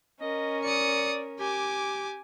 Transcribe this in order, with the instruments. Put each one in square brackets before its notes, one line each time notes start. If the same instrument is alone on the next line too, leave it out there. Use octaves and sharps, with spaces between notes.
[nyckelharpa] C#4 A#4 [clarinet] D#5
[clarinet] D5 [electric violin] D#6 C#7
[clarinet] G4 [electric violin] G#5 D6